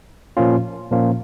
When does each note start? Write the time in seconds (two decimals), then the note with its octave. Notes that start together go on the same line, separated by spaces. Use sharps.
0.37 A#2 F3 A#3 C#4 F4
0.91 A#2 F3 A#3 C#4 F4